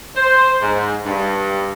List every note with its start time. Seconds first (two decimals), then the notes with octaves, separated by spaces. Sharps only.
0.16 C5
0.61 G#2
1.06 G2